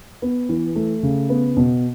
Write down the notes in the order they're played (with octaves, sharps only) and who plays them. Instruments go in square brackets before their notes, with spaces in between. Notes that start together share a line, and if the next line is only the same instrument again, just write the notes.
[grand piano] B3
E3
A3
C#3
B3
B2